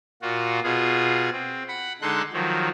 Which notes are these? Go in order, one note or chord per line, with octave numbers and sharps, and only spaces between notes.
A#2 F4 F#4
B2 F4 G#4
C4
F#5 B5
D3 G#3 D#4 A4 C6 F#6
D#3 F3 F#3